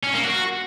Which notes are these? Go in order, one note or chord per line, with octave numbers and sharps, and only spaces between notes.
C#4
A#3
F#4